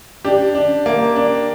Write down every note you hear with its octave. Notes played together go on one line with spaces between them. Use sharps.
D4 G4
D4
A#3
D4